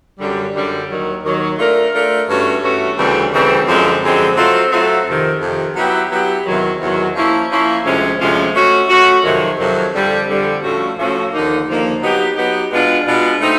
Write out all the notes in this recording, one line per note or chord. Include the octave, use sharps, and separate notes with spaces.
F#2 D3 G3
F#2 D3 G3
D#2 D#3 F#3
D#2 D#3 F#3
A3 D4 F4 A#4
A3 D4 F4 A#4
G2 E3 A3 C#4 F#4
G2 E3 A3 C#4 F#4
D2 C#3 E3 G3 C4
D2 C#3 E3 G3 C4
F#2 D3 F3 G#3 C4
F#2 D3 F3 G#3 C4
F#3 A3 C4 F4 A4
F#3 A3 C4 F4 A4
F2 C3 D#3
F2 C3 D#3
F#3 B3 E4 G4
F#3 B3 E4 G4
E2 C3 D#3 F#3
E2 C3 D#3 F#3
F3 A#3 C#4 E4
F3 A#3 C#4 E4
D2 C3 F3 G#3 C#4
D2 C3 F3 G#3 C#4
A3 C#4 F#4
A3 C#4 F#4
F2 C3 D#3 F#3
F2 C3 D#3 F#3
F2 D3 G3
F2 D3 G3
A2 F3 A3 C#4 F#4
A2 F3 A3 C#4 F#4
D#2 D3 F3 A#3 D#4
D#2 D3 F3 A#3 D#4
F#3 B3 D#4 G4
F#3 B3 D#4 G4
B2 G#3 B3 D4 F4
B2 G#3 B3 D4 F4
A3 C4 D#4